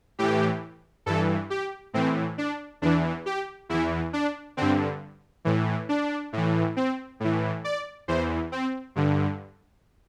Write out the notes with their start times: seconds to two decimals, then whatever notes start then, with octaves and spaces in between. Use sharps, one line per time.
0.19 A2 E3 G4
1.06 G2 E3 A4
1.50 G4
1.94 A2 E3 C4
2.38 D4
2.82 E2 E3 D4
3.26 G4
3.69 E2 E3 E4
4.13 D4
4.57 G2 D3 C4
5.45 A2 E3
5.89 D4
6.33 A2 E3
6.76 C4
7.20 A2 E3
7.64 D5
8.08 E2 E3 C5
8.52 C4
8.96 G2 D3